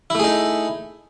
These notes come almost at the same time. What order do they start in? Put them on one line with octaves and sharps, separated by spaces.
E4 A3 G#4 D#4